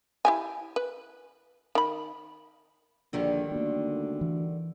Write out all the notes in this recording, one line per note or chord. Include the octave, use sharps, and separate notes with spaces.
E4 G4 G#5
B4
D#3 B5
A#1 D3 D#3 G3
D2 A#3 B3
E3